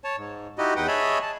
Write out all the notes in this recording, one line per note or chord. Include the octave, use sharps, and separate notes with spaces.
C#5 A5
G#2
D#4 E4 F#4 G4 D#5
E2 D#4 B4 F#5 G5
G#4 C#5 D#5 E5 A5 B5
A5